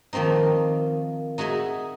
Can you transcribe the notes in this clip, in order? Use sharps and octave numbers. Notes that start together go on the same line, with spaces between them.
D#3 F3 A#3 C4 D#4
D#4 F#4 G#4 E5 G#5